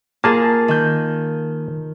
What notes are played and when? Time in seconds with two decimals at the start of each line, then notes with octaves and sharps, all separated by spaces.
0.24 A#3 F4 G#4 A#4 A5
0.68 D#3 G6